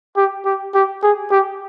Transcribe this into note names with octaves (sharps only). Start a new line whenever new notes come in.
G4
G4
G4
G#4
G4